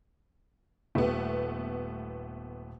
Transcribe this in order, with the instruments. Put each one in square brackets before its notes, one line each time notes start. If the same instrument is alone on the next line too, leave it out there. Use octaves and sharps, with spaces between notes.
[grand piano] D#1 G4 [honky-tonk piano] A3 B3